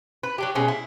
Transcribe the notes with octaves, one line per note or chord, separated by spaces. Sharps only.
B4
F#3 D4 G4
B2 G#3 C#4
E4